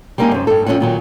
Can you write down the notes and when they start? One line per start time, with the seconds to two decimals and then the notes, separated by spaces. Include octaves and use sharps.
0.18 G3 G#3 A#3 C4 D#4 G#4
0.31 F#2 C3
0.47 G2 A4
0.66 F2 F3 C#4 C#5 F#5
0.80 A#2 D#3 F#3